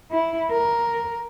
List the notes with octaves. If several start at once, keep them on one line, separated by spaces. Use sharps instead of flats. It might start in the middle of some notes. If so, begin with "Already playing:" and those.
E4
A#4